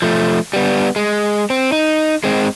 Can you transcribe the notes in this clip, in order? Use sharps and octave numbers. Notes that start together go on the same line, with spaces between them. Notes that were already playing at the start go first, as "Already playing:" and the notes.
F3 A3
G3 B3
G#3
C4
D#4
G#3 C4